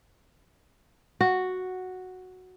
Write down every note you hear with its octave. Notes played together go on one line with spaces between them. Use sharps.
F#4